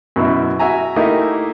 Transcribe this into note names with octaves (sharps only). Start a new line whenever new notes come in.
F#2 B2 E4
F#4 E5 G#5 A#5
A3 A#3 D#4 E4 G4